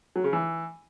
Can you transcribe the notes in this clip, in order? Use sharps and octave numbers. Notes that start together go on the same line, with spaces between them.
F#3
C#3
E3